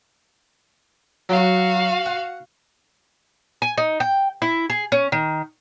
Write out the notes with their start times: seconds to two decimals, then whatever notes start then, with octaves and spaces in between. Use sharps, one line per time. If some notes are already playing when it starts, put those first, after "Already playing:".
1.29 F#3 F#4 F5
2.06 F#5
3.62 G#5
3.78 D#4
4.00 G5
4.42 E4
4.70 G#4
4.92 C#4
5.12 D#3